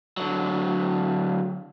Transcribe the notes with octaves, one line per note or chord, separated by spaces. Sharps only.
D3 F#3